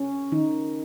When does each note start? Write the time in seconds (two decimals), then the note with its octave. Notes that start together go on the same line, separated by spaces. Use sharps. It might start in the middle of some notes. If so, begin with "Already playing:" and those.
Already playing: C#3 C#4
0.32 D#3 D#4